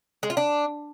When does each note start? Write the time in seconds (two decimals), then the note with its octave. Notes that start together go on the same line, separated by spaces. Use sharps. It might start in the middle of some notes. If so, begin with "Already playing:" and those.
0.23 G#3
0.30 F4
0.37 D4